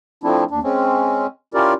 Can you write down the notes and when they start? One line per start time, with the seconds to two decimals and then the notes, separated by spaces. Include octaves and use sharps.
0.24 F3 A3 C4 D4 E4
0.51 D#2 D4
0.63 G#3 C4 C#4
1.54 C#4 E4 F4 G4 A#4 D5